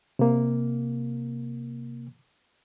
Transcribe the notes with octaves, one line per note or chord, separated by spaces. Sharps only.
C3 A#3